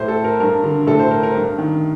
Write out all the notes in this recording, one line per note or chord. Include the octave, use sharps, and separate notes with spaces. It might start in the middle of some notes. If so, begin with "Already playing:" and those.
Already playing: A2 C5
A4
A#4
G2 A#4
D3
A2 A4
C5
A#4
A#4
G2
D#3